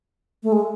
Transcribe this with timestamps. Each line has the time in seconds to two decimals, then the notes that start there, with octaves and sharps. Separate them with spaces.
0.43 A3
0.52 G#3